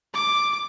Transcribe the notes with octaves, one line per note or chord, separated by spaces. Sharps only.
D6